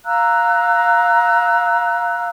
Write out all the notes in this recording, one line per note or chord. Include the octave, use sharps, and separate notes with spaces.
F5 A#5 E6 F#6